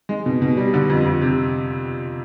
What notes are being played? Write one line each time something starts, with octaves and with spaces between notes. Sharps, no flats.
G#3
B2
B2
G3
D3
F2
F2
C3